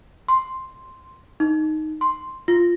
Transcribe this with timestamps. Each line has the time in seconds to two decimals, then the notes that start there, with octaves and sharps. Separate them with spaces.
0.28 C6
1.40 D#4
2.01 C6
2.48 F4